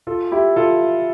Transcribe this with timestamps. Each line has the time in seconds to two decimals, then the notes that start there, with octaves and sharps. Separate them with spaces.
0.07 F4 A4
0.32 E4 G4
0.56 F4 A4